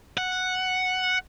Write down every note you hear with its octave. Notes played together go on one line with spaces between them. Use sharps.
F#5